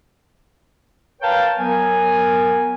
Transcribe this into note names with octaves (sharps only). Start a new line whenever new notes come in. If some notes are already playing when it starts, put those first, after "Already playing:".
A#4 B4 C#5 F5 G5 A5
F#3 B3 A#4 G#5